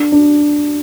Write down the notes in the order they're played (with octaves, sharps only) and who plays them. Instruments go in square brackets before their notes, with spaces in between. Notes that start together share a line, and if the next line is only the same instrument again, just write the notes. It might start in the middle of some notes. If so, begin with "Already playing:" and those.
Already playing: [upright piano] D4
D4